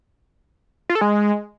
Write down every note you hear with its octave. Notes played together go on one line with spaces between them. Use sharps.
F4
A4
G#3